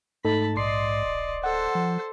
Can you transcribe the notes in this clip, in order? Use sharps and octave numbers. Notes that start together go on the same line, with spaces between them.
G#2 A3 D#4 A4 A5 B5
A#1 D5 D#5 C6 C7
D1
A4 C5 F#5
F3